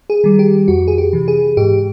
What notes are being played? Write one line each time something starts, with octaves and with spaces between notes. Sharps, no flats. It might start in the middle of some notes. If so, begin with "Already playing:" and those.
G#4
D#3 G3
G4
F2 F#4
G#4
G4
C3 E3
G#4
G#2 G4